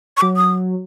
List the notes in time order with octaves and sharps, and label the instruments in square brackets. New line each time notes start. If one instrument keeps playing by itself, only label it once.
[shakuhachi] C#6
[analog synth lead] F#3 [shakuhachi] D6
[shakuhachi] D#6